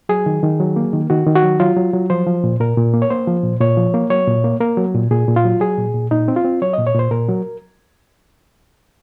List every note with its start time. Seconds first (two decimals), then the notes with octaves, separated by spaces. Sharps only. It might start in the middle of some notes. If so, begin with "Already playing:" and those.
0.09 F#3 G#4
0.26 D#3
0.43 D#3
0.60 F#3
0.76 A#3
0.93 D#3
1.10 D#3 F#4
1.27 D#3
1.35 F#4
1.43 F#3
1.60 F#3 F4
1.76 F#3
1.93 F#3
2.10 F3 C5
2.26 F3
2.44 A#2
2.60 A#2 A#4
2.77 A#2
2.94 A#3
3.02 C#5
3.10 A#3 C5
3.27 F3
3.43 A#2
3.61 A#2 C#5
3.77 F3
3.94 A#3
4.10 F#3 C#5
4.28 A#2
4.44 A#3
4.60 A#3 A#4
4.77 F#3
4.94 A#2
5.11 A#2 G#4
5.28 A#2
5.36 F4
5.44 F#3
5.60 F#3 G#4
5.78 A#2
5.95 A#2
6.11 A#2 D#4
6.28 C4
6.36 F4
6.44 C4
6.62 F#3 C#5
6.73 A#2 D#5
6.87 C#5
6.95 A#2 C5
7.11 A#2 A#4
7.29 F#3